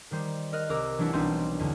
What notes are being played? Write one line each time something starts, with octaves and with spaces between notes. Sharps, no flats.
D#3 G3 C5
A#4 D#5 F6 F#6
C2 A#4 D6 E6
E3 F#3 G#3 D4 E4 F#4
B1 G3 C4 D4 D#4 C6
E2 D3